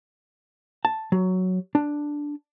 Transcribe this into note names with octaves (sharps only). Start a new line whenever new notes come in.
A5
F#3
D4